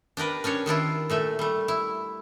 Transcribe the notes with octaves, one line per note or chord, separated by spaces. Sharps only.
D4 G4 A#4 B4
C#4 D4 G4 C#5
D#3 D4 E4 F4
A#2 A3 E5
G3 A3
E4